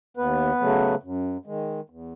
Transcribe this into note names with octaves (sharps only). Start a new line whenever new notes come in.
D#2 B3 B4
C#3 F#3 A3
F#2
D#3 G#3
E2